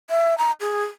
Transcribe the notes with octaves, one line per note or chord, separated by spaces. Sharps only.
E5
A#5
G#4